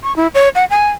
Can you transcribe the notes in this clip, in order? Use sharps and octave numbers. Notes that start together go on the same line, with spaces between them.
C#6
E4
C#5
F#5
G#5